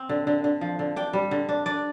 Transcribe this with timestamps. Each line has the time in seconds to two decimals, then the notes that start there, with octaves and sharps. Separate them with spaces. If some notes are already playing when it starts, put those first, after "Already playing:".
Already playing: C4
0.09 D3
0.27 D3
0.44 D3
0.61 F3
0.79 D3
0.96 D4 G5
1.13 G3
1.31 D3
1.49 D4
1.66 D4 D5